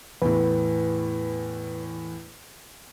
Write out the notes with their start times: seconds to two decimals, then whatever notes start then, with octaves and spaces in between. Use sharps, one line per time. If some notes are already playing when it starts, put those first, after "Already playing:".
0.22 E2 A2 B4